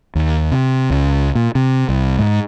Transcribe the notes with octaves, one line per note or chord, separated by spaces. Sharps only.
D#2
C3
C#2
A#2
C3
C2
G#2